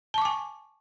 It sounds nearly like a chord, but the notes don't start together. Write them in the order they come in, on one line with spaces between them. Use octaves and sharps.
A5 C#6 D6 G#5